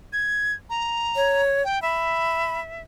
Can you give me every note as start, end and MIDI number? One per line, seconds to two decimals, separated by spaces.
0.13 0.54 92
0.70 1.42 82
1.16 1.63 73
1.64 1.81 79
1.82 2.82 76
1.82 2.60 83